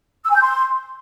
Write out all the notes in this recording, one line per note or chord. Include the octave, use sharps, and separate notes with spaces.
E6
G#5
G6
C6